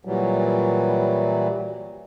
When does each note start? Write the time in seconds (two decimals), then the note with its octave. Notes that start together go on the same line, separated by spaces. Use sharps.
0.05 A#2 E3 F#3 G3